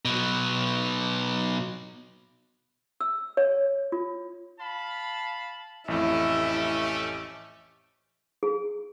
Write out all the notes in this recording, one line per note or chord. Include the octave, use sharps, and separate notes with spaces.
B2 F#3
E6
C#5
F4
F5 A5 B5
A1 F2 A3 C#4 E4 G4
G#4